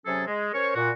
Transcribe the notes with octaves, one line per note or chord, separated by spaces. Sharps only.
C3 F#3 C#4 G#4 A4
G#3
C#4 A#4 C5 C#5
A#2 F#4